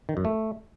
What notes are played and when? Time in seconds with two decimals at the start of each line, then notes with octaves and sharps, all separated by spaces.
0.09 D#3
0.17 F#2
0.25 A3